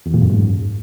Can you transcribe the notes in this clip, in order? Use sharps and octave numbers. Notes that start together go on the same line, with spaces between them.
E2
A#2
F#2
G#2